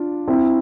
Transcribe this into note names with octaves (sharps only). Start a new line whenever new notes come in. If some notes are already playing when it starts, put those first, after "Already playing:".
Already playing: D4 F4
C4 E4